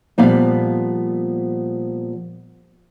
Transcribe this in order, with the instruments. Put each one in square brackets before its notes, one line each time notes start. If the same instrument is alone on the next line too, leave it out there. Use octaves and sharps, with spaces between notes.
[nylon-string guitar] A#2 F3 G3 B3 D5 F5